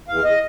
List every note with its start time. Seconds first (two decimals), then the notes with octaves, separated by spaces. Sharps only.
0.08 E2 F5
0.24 D#5